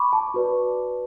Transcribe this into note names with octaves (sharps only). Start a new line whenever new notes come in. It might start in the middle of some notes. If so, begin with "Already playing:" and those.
Already playing: B5 C#6 D6
A5
F#4 B4 D5